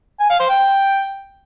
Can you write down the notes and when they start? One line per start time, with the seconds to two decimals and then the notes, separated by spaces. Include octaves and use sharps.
0.20 G#5
0.30 F5
0.40 C5
0.50 G5